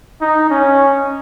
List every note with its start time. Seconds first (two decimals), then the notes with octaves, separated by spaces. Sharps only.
0.21 D#4
0.50 C#4